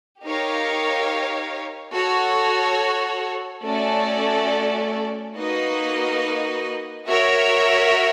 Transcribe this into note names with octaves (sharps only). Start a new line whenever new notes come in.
D#4 G4 A#4 C#5 F5
F#4 A4 C#5
A3 C#4 F#4 A4 D5
A#3 D#4 F#4 B4 D#5
F#4 A#4 C#5 E5